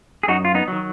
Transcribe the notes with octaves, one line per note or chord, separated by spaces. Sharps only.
G#4
F#2 D#4 F#4
F4
B3 D#4
D#3 F#3